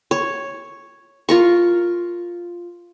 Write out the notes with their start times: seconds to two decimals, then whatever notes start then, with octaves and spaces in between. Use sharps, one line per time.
0.11 C#5
1.29 F4 A#4 C#6